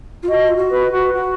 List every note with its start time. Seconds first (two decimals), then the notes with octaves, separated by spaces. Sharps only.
0.23 F4
0.29 F#4 D#5
0.48 F4
0.57 F#4
0.71 B4
0.92 F#4
1.14 F#4